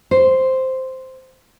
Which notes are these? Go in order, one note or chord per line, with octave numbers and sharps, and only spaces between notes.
C5